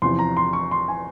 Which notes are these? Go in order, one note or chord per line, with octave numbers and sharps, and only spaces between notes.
E2 C3 F3 C6
A#5
C6
C#6
C6
G#5